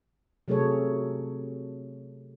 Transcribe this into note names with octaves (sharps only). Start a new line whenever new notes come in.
C3 F#3 A3 G#4 A4 C#5